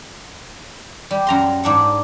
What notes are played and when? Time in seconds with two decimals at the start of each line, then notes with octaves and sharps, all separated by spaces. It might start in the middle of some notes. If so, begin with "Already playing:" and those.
1.11 G3
1.27 F#2 A#5 C6
1.64 G#2 D4 F#5